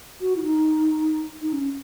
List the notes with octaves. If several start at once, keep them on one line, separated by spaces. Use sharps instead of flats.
F#4
E4
D#4
D#4
C#4